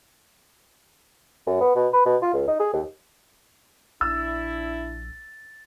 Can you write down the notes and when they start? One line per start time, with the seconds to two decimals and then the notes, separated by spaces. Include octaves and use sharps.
1.47 F#2
1.60 B3
1.76 B2
1.93 B4
2.06 B2
2.22 F4
2.33 C#2
2.48 D#4
2.60 G#4
2.73 D#2
4.01 A#1 D4 E4 E6 A6